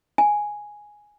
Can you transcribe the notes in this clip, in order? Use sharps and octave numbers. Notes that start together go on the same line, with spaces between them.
G#5